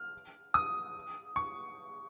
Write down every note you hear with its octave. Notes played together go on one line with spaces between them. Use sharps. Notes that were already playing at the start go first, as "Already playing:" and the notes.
Already playing: F6
D#6
C#6